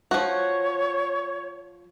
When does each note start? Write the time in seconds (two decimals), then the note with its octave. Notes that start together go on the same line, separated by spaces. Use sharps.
0.11 F3 F#4 C#5